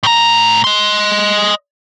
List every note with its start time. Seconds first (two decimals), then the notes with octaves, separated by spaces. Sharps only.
0.03 A2 A#5
0.64 D#5 C6